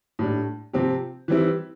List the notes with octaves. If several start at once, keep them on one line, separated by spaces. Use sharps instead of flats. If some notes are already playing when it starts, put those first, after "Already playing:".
A2 G3 D4
C3 F3 C4 G4
E3 G3 C4 E4